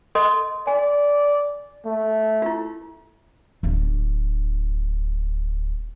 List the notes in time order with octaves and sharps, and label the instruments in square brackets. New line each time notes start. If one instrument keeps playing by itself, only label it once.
[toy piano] A4 D#5 C6
[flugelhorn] D5 [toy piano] G#5
[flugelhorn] A3
[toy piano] E4 F4
[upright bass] D1 D4